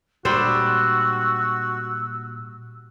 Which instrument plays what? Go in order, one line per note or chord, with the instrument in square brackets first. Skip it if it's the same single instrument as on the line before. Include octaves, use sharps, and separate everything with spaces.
[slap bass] A#2 G#3 [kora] G3 D4 C5 [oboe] F#4 [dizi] E6